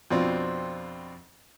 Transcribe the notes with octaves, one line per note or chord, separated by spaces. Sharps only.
F2 B2 C4 D4 F4